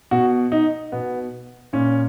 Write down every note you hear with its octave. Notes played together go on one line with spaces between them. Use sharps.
B2 F#4
D#4
B2 B3
A#2 C#4